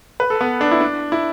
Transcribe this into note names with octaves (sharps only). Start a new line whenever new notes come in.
B4
A4
B3
D4
E4
D4
E4